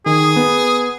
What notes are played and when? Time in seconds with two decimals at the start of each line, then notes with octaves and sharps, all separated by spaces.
0.06 D#3 G#4
0.36 B3